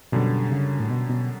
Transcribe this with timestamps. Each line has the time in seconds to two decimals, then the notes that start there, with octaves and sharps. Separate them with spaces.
0.12 F#2 B2 D3 G3
0.52 C#3
0.80 A2
0.90 B2
1.09 B2